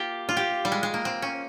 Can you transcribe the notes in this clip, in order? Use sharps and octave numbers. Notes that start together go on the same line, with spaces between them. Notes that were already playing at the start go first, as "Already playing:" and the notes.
Already playing: A#3 F4 G4
F4
G4
G3
G#3
G#3
A#3
C4
C#4